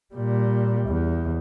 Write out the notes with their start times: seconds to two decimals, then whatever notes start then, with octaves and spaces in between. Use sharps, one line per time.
0.14 A#2 G3
0.88 E2